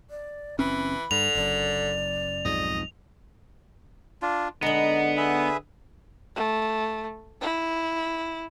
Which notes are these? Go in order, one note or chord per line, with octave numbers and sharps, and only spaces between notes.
D5
F#1 E3 C4 C#4 B5
G2 D3 F7
F#1 F#2 D5
B1 F2 G#2 D#5
D4 F4
D3 G#3 B3 D#4 A#5
G#4 B4 E5
A3
E4